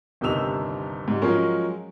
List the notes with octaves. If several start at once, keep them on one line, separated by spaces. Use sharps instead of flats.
G1 D#2 C3 D#4 E6 F7
G#2 G3
F3 F#3 G#3 C#4 A#4